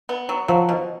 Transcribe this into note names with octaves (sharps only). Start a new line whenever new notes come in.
B3
F#3
F3 F#3
B2